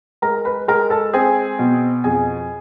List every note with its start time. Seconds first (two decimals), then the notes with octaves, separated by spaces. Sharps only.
0.22 G#3 A#4 A#5
0.45 B4 B5
0.68 G#3 A#4 A#5
0.90 A4 A5
1.13 C4 G#4 G#5
1.59 B2
2.04 F2 G#4 G#5